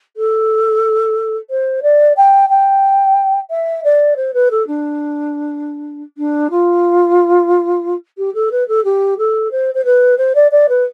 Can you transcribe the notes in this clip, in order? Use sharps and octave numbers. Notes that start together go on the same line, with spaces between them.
A4
C5
D5
G5
G5
E5
D5
C5
B4
A4
D4
D4
F4
G4
A4
B4
A4
G4
A4
C5
C5
B4
C5
D5
D5
B4